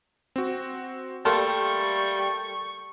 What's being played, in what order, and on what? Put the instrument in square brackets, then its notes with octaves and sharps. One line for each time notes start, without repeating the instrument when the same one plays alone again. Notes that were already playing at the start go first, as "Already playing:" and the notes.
[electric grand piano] C4 F#4
[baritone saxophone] G3 [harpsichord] A3 A#3 A4 [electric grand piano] A5 C6 F6 [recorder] C#6